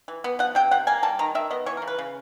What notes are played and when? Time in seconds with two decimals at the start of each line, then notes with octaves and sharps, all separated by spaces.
0.08 E3
0.24 B3
0.39 F3 F#5
0.55 C3 G5
0.71 C3 F#5
0.87 A#3 G#5
1.03 G3 A5
1.19 D#3 A#5
1.35 D#3 E5
1.50 B3 D#5
1.66 E3 C#5
1.77 A#4
1.82 C#3
1.88 B4
1.99 C#3